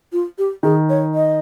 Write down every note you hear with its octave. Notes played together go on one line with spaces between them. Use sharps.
F4
G4
D#3 G#4
C#5
D#5